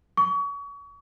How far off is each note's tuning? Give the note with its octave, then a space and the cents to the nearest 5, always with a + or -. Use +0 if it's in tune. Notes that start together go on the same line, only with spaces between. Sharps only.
C#6 +35